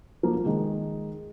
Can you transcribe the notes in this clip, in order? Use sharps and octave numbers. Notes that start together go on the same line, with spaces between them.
F3 A#3
A#3
D#3 G#3